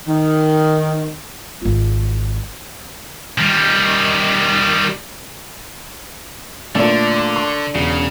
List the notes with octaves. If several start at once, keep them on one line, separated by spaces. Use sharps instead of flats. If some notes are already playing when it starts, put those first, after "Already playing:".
D#3
G#1 F4
D#3 G3
A#2 D3 A3 D4 D5
C6 C#6
E1 C#3